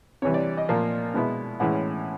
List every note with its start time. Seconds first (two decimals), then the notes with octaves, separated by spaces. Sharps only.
0.22 C3 E3 G3 C#5
0.34 D5
0.57 D#5
0.69 A#2 F3 A#3
1.14 B2 G#3 B3 E4
1.60 A2 E3 G#3 C#4 E4 F#5